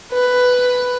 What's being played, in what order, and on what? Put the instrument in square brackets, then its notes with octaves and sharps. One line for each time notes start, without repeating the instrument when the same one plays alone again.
[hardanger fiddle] B4